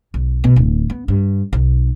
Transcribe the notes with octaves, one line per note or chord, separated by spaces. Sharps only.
B1
B2
D1
B3
G2
B1